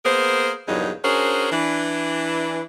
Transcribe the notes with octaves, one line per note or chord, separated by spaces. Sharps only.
A#3 B3 G#4 A#4 C5
E2 G2 A#2 C#3 F#3 D#4
C#4 D4 F#4 G#4 A#4 C5
E3 D4